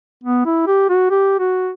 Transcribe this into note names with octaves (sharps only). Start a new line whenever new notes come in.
B3
E4
G4
F#4
G4
F#4